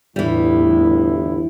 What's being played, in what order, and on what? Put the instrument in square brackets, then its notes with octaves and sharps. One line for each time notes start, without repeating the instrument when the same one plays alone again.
[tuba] G1 [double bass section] E2 A2 [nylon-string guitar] E3 G3 [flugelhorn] E4